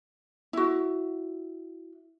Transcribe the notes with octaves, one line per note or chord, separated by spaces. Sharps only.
E4 F#4